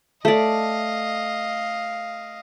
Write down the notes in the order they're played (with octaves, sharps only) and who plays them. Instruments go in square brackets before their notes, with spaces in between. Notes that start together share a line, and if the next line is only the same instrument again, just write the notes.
[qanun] A3 D5 [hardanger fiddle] D#5 F5